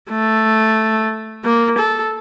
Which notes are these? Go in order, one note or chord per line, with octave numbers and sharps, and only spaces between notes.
A3
A#3
A4